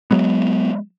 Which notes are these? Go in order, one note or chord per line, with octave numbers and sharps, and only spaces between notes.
F#3 G#3 B3